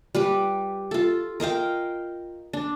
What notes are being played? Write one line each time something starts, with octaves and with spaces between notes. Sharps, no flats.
G3 G4 B4
F4 A4
A#4 D#5 F5 G5
D4